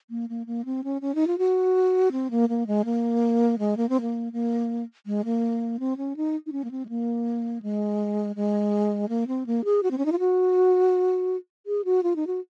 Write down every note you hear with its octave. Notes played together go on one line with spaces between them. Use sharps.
A#3
A#3
A#3
C4
C#4
C#4
D#4
F4
F#4
C4
A#3
A#3
G#3
A#3
G#3
A#3
C4
A#3
A#3
G#3
A#3
C4
C#4
D#4
D#4
C#4
A#3
C4
G#3
A#3
G#3
G#3
A#3
C4
A#3
G#4
F#4
C4
C#4
D#4
F4
F#4
G#4
F#4
F4
D#4
F#4